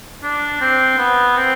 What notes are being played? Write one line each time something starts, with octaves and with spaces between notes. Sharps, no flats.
D4
C4
B3
C4